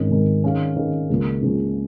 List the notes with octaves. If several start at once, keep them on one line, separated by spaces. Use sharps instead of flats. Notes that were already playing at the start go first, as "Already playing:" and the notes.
Already playing: G#1 G#2 D#3 C#4 A#4
G#1 G#2 D#3 C#4 A#4
D#3 C#4 G#4 F5
D#3 C#4 G#4 F5
C#2 C#3 F3 A#3
C#2 C#3 F3 A#3